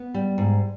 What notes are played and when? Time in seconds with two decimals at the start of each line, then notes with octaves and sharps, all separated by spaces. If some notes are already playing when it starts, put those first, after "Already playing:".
Already playing: B3
0.14 G3
0.38 G#2